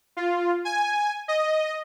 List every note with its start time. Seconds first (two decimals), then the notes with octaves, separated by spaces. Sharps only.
0.17 F4
0.65 G#5
1.28 D#5